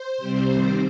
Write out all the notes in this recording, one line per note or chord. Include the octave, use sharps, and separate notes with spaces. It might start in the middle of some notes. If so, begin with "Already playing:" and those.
Already playing: C5
C3 G3 C4
D#3 G3 C4